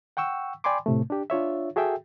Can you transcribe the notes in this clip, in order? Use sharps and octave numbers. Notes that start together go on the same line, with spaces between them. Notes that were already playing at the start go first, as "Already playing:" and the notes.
F#5 G5 C#6 E6
D5 G5 G#5 B5 C6 D6
A2 C3 A3
D4 G4
D4 F4 C#5 E5
F#4 G#4 A4 E5 G5